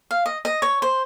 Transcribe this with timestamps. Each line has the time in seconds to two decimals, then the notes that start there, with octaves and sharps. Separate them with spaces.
0.11 F5
0.26 D#5
0.45 D#5
0.62 C#5
0.82 C5